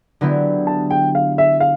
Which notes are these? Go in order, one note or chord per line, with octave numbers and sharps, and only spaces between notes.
D3 F#3 B3 E4 G4
A5
G5
F5
E5
F5